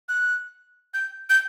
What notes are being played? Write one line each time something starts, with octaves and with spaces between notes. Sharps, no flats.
F#6
G6
G6